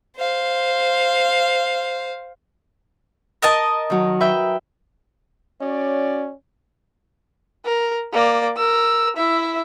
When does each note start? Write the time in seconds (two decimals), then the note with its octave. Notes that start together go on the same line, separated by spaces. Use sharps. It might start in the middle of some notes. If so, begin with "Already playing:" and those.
0.17 C5 F5
3.42 A#4 D#5 A5
3.90 D#3 F#3
4.20 B4 E5 G5
5.61 C#4 F#4 C#5 D5
7.66 A#4
8.13 A#3 D5
8.57 A#4 E6
9.17 E4 E5